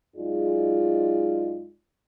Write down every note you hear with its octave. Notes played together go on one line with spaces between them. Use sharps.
F#2 G#3 D#4 F4 G#4 D5